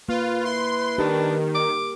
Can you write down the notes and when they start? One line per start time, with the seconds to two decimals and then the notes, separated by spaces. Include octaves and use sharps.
0.09 A#3 F4 B4
0.44 E4 C6
0.98 D#3 D4 G4 A#4
1.55 D6